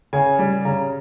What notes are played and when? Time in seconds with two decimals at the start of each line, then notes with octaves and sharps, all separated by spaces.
0.13 C#3 G#5
0.39 G3
0.65 C#3 A#5